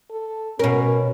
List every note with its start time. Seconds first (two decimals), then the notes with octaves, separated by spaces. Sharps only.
0.11 A4
0.59 B2 C#4 A#4